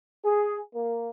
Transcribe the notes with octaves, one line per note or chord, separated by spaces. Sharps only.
G#4
A#3